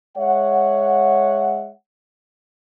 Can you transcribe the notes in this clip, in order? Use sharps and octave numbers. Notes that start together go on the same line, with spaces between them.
G#3 C#5 E5 F#5